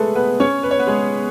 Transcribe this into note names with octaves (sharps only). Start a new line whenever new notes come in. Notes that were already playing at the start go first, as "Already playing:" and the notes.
Already playing: G#3 A3 G#4 A4 B4
B3 B4
C#4 C#5
B4
C#5
B3 B4
G#3 G#4